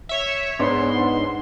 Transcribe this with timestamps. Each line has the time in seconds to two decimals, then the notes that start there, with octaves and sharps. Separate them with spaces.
0.09 C#5 E5
0.59 G#2 B3 D4 C#5 F#5 C6